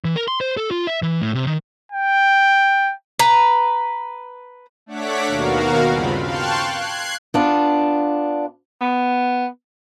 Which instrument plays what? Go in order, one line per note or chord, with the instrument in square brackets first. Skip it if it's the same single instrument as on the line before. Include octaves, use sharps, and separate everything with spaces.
[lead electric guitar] E3
A#4
C6
C5
A4
F4
E5
E3
A2
C3
D#3
[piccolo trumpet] G5
[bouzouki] B4 A#5
[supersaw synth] A3 D4 C#5 F#5 D6 B6
D#2 B2 F#4 A#4 F5
G2 C#3 C4 F4 B5
F5 G5 A5 C6 C#6 F#6
F#6 G#6 C7
[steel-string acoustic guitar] B3 D4 F4
[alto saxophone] B3